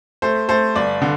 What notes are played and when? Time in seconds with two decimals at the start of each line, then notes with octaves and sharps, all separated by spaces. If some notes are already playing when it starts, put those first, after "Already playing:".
0.22 A3 C5
0.49 A3 C5
0.75 G1 D5
1.02 D3